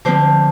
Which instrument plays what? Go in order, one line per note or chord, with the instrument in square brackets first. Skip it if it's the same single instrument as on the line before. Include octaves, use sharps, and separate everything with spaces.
[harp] D3 F3 C4 C5